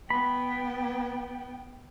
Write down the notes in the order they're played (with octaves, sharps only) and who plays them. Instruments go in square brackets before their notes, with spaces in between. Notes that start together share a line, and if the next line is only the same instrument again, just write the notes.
[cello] B3 G5 [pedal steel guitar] B5